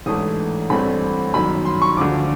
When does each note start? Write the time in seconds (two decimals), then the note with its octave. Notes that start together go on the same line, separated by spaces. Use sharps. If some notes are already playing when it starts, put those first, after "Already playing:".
0.06 A1 G#2 E3 A3 D4 D#6
0.70 A1 G2 E3 A3 C4 B5
1.34 G1 F#2 D#3 B5
1.65 C6
1.82 C#6
1.97 D2 D3 F3 D6